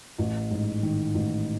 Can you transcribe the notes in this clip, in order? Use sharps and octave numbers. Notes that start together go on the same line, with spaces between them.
A1
G#2
D#3
A1